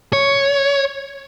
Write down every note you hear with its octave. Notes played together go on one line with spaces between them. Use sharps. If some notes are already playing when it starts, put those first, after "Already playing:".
C#5